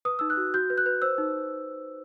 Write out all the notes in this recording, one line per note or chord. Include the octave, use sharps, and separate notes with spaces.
B4 D#6
D#4 E6
F#6
F#4
F#4 G6
B4
F#6
B4
C5 E6
D#4